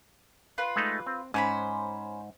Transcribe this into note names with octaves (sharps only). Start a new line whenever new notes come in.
F4 B4
G#3 A3 D#4
C4
G#2 C#4 C5 B5